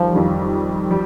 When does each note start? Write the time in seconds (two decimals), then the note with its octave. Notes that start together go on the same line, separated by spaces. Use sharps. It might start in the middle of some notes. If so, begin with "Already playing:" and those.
Already playing: F2 D#3 F3 G3
0.13 F2 D#3 G3
0.91 G3